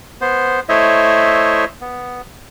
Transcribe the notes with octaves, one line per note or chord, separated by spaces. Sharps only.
B3 C5
A3 E4 C5 C#5 D#5 E5
B3